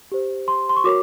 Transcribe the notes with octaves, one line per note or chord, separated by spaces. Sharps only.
G4 C5
C6
C6
C#6
F#4 A#4 C#5 D6